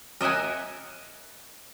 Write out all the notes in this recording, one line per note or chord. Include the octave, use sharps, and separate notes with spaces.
A#4 D#5 E5 F#5 G#5